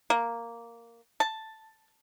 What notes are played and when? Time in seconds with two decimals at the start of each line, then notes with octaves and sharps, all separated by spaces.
0.10 A#3
1.20 A5